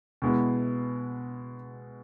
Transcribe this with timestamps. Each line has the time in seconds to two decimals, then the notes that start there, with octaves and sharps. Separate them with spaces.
0.22 B2 G#3 B3 E4